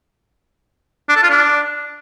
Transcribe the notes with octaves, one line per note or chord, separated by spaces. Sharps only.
D4
A4
F4
D4